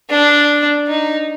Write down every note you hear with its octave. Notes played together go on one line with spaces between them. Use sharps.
D4
D#4